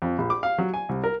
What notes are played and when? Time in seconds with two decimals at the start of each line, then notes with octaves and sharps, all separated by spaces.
0.02 F2
0.18 A#1
0.30 D6
0.43 F5
0.58 F#3
0.74 G#5
0.89 C2
1.04 A#4